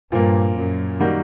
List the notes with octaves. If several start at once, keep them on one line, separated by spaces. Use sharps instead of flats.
G2 A#2 F3 A#3
F#2
D#3 G3 A#3 D#4 F#4